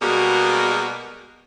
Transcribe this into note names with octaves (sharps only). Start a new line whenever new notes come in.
B2 G3 G#3 A#3 F#4 G#4